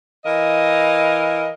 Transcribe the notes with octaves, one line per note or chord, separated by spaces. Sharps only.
E3 A#4 D#5 F5